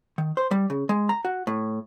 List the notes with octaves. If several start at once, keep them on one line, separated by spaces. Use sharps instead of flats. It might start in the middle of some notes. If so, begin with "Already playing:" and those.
D#3
C5
G3
C#3
G#3
A#5
F#4
A2